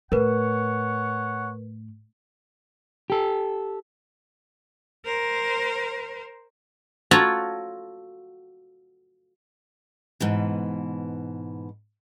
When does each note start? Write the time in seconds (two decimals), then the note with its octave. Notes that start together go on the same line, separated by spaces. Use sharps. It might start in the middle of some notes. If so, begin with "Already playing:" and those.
0.12 A2 A#4 B4 C#5 F#5
3.10 G4 A4
5.05 A#4 C5
7.11 F4 F#4 A4 C#5 A#5
10.20 G#2 B2 E3